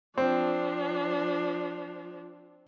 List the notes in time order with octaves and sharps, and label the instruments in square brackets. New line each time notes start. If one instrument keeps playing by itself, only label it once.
[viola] F3 D4 [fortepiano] C4